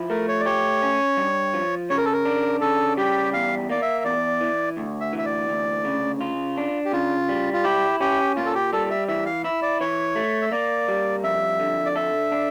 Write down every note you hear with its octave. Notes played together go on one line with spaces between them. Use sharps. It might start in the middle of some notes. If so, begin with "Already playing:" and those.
Already playing: F3 E4
A3 A#4
C#5
D5
G4 C#5
C#4
G2
F3
C#3 C#5
A#4
A4
A#4
D4
C#3 A4
G3 G4
E2 F5
A#3 D5
E5
E2 D5
E3
D2
E5
E3
E5
D5
D2
C#3
F4
D4
G4
C#3 F4
G3
F4
E4 G4
C#4 G4
A#2 F4
A4
G4
G3 A4
E5
E3 E5
F5
E4 E5
D5
E3 C#5
A3
E5
A#3 D5
G3
F2 E5
D3
D5
A4 E5
D4